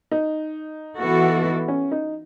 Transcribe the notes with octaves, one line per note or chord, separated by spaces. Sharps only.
D#4
E3 B3 F#4 A4
C#4
D#4